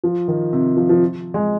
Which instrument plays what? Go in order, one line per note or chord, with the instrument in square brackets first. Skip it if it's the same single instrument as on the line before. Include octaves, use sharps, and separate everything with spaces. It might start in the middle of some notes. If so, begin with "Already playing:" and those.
[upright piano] F3
D#3
C3
F3
F3
G#3